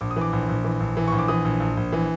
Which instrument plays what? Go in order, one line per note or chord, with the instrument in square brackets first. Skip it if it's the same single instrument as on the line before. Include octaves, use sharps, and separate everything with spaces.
[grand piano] A#1 D6
D#6
E3
D6
A#1
A#1
E3
A#1
E3
A#1 C#6
D6
E3 D#6
A#1
A#1
A#1
E3